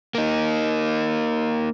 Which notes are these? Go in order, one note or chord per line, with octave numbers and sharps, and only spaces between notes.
A#3 D#4